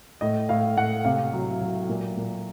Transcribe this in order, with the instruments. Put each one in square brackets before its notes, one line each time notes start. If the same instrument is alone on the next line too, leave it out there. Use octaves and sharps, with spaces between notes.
[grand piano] A2 D#5
A2 F5
A2 F#5
C3 F5
F#3
F#3
A#2
A#2